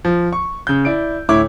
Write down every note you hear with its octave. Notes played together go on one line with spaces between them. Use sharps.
F3
C#6
C#3 G6
E4 D5 D7
D2 A2 E4 C#5 D6